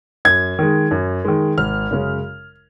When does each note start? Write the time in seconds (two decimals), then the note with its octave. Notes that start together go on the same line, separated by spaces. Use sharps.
0.25 F#2 G#6
0.59 D#3 G#3
0.91 F#2
1.25 D#3 G#3
1.58 G#1 F6
1.91 F#2 C#3 G#3 C#4